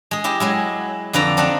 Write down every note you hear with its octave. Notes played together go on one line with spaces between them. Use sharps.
G#3 G#4
E4 G4 D#5
F#3 G#3 E4
F2 D3 B4 D5 A#5
C4 D4 D#4 F#5